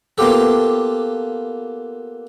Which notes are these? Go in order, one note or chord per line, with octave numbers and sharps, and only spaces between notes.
A#3 B3 F4 G4 A4